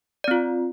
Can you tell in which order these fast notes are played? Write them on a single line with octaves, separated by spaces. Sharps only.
D5 C4 F4